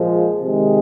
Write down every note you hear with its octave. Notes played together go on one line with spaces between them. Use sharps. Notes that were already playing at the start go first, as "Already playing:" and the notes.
Already playing: A#2 F3 G#3
C3 D#3 G#3